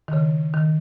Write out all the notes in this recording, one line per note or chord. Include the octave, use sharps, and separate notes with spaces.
D#3
C#3
D#3